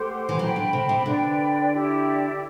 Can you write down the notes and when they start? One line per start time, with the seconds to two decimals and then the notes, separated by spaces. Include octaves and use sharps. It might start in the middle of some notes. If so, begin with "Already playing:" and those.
Already playing: A3 G4 C5 F#5 C6
0.29 E3
0.39 F#3 C5 G5 B5
0.56 D3
0.73 C3
0.89 C3
1.05 D3 B4 D5 G5
1.72 E4 G4 D5